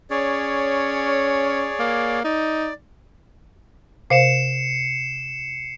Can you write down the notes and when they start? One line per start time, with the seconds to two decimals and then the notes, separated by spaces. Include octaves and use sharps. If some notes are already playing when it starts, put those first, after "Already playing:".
0.11 C#4 G#4 C#5 D5
1.79 A#3
2.24 D#4 D5
4.10 C3 C5 F5 C7 C#7 E7